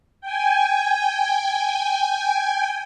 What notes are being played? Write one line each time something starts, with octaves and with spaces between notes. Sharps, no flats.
G5 G#5